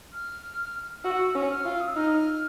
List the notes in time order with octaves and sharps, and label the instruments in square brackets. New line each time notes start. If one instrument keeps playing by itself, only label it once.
[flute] F6
[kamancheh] F#4 [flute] E6
[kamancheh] C#4
[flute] F6
[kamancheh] F4
[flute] D#6
E6
[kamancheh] D#4 [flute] F6